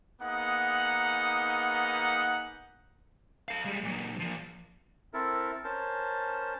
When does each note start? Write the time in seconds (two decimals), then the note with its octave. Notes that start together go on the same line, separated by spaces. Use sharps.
0.21 A#3 B3 D#4 G#4 F#5
3.48 A4 F5
3.65 G3 G#3
3.83 A#2 F#3
4.19 F3 A#3
5.14 C4 E4 A4 A#4
5.64 C#4 A#4 C5 A5